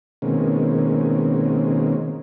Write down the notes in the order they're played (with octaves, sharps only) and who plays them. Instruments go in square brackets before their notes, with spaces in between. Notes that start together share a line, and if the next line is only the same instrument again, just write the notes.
[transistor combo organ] B2 D#3 G#3 A#3 C4 C#4